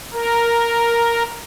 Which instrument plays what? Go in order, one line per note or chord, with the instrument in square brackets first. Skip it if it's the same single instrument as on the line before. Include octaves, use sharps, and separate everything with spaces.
[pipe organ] A#4